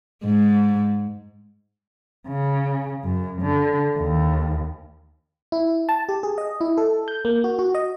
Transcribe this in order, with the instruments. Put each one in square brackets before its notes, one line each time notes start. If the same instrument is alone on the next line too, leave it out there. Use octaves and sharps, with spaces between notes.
[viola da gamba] G#2 G#3
[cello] C#3
F#2
D3
D#2
[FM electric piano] E4
A5
G4
G#4
D#5
E4
A4
G6
A#3
F#4
F#4
D#5